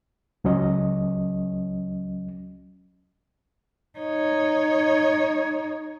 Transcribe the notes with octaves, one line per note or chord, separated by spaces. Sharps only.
C#2 F#3 C#4 D#5
D#4 C#5